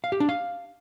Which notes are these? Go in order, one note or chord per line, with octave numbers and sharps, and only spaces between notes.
F5
G4
D4
F5